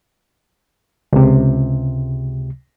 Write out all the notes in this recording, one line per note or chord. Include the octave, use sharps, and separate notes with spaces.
C#2 C3